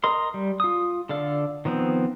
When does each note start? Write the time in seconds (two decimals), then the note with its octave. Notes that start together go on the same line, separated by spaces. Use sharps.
0.04 A#4 D#5 C6
0.34 G3
0.60 F4 D#6
1.09 D3 A4 D5 F5
1.65 D#3 F3 B3 C4